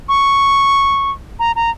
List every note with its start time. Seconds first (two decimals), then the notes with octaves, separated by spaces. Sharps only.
0.09 C#6
1.39 A#5
1.56 A#5